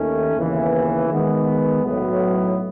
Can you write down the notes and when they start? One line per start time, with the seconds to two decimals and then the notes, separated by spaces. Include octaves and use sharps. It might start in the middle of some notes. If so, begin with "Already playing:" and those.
Already playing: D#2 D#3 A3 C#4
0.36 D#2 C#3 E3 B3
1.10 D#3 G#3 B3
1.84 B1 A2 F#3 B3